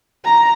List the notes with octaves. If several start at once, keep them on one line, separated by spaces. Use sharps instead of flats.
A#5